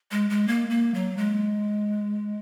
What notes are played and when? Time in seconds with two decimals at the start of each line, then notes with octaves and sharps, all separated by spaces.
0.11 G#3
0.30 G#3
0.48 A#3
0.70 A#3
0.94 F#3
1.17 G#3